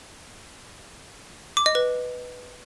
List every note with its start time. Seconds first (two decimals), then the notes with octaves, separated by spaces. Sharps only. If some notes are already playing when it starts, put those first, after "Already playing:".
1.57 D6
1.66 D#5
1.75 B4